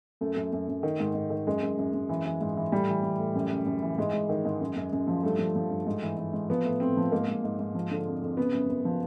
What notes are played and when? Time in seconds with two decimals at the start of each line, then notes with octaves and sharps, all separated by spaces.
0.21 F#2 A3
0.37 F#2
0.53 F#2
0.68 F#2
0.83 D#3
1.00 G#2
1.15 G#2
1.30 D#3
1.47 F#2 G#3
1.62 F#2
1.78 F#2
1.94 F#2
2.09 E3
2.25 E3
2.41 G#2
2.57 E3
2.72 A2 G3
2.89 E3
3.03 E3
3.19 A2
3.35 F#2
3.51 C#3
3.66 F#2
3.82 E3
3.98 G#2 G#3
4.13 G#2
4.29 D#3
4.45 G#2
4.61 F#2
4.76 F#2
4.93 F#2
5.07 F3
5.23 G2 A3
5.39 F3
5.56 F3
5.70 G2
5.87 G#2
6.02 E3
6.18 E3
6.33 G#2
6.50 F3 B3
6.65 A2
6.80 A2 C4
6.97 F3
7.11 G#2 A#3
7.27 G#2
7.44 G#2
7.60 G#2
7.75 F3
7.91 D3
8.07 F2
8.22 F2
8.37 C#3 B3
8.54 F#2
8.69 F#2
8.85 F3